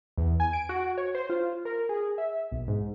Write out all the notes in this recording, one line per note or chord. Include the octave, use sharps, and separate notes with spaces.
E2
G#5
D7
F#4
C#5
C5
F4
A#4
G#4
E5
B1
G#2